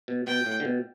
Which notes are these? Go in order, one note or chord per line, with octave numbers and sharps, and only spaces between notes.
B2
B2 G5
A2
D3
B2